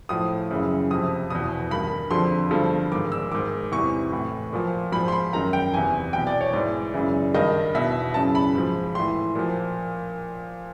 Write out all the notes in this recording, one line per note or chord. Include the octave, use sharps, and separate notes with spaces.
A2 F3 D#6
F#2 C#3 E3
F2 C3 F3 D#6
E2 B2 D#6
G2 D#3 B5
F2 D3 F3 C6
G2 D3 F3
G#2 D#3 D6
E6
G#2 D#3 D6
E2 C3 E3 C#6
A2 E3
A#2 F3
G#2 F3 B5
C6
B5
F#2 D#3 A#5
G5
E2 C3 E3 G#5
E2 B2 G5
D5
C#5
G#2 E3 D5
F#2 C#3 E3
G2 D#3 D#5
E2 B2 E5
F#2 C#3 E3 A5
B5
G#2 F3
A2 E3 C6
A#2 F3